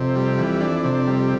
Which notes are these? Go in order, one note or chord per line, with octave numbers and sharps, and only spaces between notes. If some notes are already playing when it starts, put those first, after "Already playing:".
Already playing: F2 C3
G3
E3
D4
C3
G3